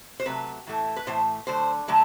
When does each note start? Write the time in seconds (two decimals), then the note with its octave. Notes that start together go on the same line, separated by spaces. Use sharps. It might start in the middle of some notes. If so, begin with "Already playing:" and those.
0.20 C5
0.25 C3 F#3 A3 B4
0.66 A2 E3 A3
0.96 B4
1.07 A2 E3 A3 C5
1.47 D3 F#3 A3 C5
1.88 D3 F#3 A3